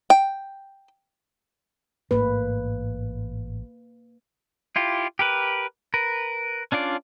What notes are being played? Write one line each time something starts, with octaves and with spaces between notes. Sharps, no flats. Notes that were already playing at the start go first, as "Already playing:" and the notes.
G5
A1 G#2 A3 A#3 B4
E4 F4 G4
G4 A#4 B4
A#4 B4
C#4 D4 F4 D5